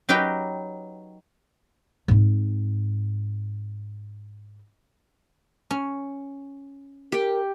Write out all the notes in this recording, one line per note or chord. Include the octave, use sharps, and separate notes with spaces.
F#3 D#4 G4 B4 G5
G#2 C4
C#4
G4 A#4 G5